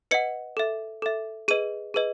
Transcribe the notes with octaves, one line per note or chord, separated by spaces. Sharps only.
B4 D#5 F#5 C#7
A4 E5
A4 E5
G#4 B4 D#5 D#7
G#4 B4 D#5